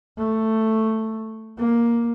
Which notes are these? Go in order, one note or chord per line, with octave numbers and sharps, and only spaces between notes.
A3
A#3